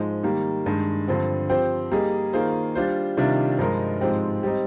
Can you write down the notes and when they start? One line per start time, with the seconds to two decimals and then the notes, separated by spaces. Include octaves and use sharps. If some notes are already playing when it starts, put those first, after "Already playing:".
Already playing: G#2 F3 G#3
0.23 D#3 G3 A#3
0.66 G2 D#3 G#3
1.08 G2 D3 F3 C4
1.49 F3 C4 G4 C5
1.92 G3 A#3 D#4 G#4
2.33 D#3 A#3 F4 G#4 C5
2.75 G3 D4 F4 C5
3.17 C3 D#3 G3 D4 F4
3.59 G2 F3 G#3 D#4 A#4
4.01 G#2 F3 G#3 C4 G4
4.43 G3 C4 D#4